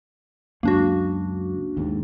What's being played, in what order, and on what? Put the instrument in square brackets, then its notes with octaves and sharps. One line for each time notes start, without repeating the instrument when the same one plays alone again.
[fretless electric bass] C#2 F#2 [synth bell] A#3 D4 F#4
[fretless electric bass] D#2 G#2